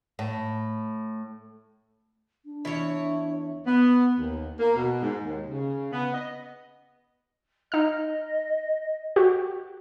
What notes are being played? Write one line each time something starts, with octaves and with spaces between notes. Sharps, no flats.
A2
D4
E2 E4 C#5
B3
D#2
A#3
B2
G#2
D#2
C#3
B3
D#5
D#4 D#5 F6
F#4 G4